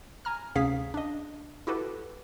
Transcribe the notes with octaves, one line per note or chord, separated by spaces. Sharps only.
G#5 A#5 F6
D2 C3 C#4 G#4 F5 B6
D4 D#5
E4 F#4 G4 A4 B4